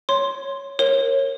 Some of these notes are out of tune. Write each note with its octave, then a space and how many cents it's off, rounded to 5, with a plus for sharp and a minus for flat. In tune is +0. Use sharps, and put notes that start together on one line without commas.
C#5 +0 C6 +0
A#4 +0 C#5 -25